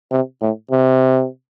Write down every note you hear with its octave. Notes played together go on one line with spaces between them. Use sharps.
C3
A2
C3